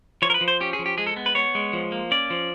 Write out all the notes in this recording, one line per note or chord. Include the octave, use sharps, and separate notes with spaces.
F3 C#5
A#4
B4
F3
C5
C#4 G4
G#4
F3
G4
G#3 G#4
A4
B3
B4
B3 C#5
G#3
F3
A#3
C#4 D5
F3